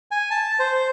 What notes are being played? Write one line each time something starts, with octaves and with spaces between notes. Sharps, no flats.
G#5
A5
C5